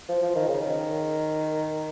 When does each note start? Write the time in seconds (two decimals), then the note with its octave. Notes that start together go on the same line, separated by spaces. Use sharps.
0.09 F3
0.22 F3
0.35 D#3
0.48 C#3
0.61 D#3